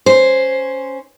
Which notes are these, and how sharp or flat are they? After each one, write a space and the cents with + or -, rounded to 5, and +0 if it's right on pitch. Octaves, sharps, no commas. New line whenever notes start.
C#4 +0 C5 +0